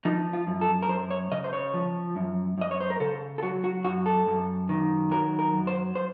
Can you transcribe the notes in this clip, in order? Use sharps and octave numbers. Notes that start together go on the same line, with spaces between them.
F3 D#4
F4
F#2
A4
A#4
F#2 C5
C#5
C#3 D#5
C5
C#5
F3
F#2
F#2 D#5
C#5
C5
A#4
C#3 A4
A4
F#3 F#4
F#4
F#2 F#4
A4
F#2
D#3
F#3 A#4
A#4
F#2
C5
C5